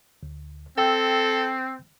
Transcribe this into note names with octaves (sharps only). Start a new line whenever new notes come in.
D2
C4 A4 G5 E6